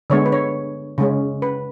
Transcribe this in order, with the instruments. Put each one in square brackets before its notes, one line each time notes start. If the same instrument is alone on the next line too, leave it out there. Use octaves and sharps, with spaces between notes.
[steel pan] D3 G#3 B3 C#5
B4
C#5
C#3 G#3 C#4
B4